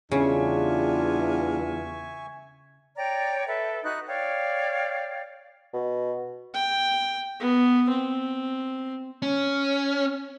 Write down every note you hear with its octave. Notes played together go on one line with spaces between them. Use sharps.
E2 C#3 G3 D4 F4 E5 G#5 C#6
C#5 D5 G5 A#5
A4 B4 E5
D#4 F#4 B4 F#6
C#5 D5 F5 G5
B2
G5
B3
C4
C#4